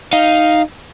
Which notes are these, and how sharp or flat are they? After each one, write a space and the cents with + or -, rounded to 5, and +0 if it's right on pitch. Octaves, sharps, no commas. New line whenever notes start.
D#4 +0 F5 +0